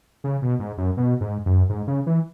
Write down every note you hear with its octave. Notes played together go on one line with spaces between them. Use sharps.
C#3
B2
G#2
F#2
B2
G#2
F#2
G#2
C#3
E3